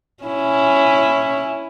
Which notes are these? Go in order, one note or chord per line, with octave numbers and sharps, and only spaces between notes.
C#4 E4